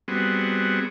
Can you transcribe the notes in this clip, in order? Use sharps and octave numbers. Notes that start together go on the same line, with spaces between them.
G3 B3 C4 F#4 G#4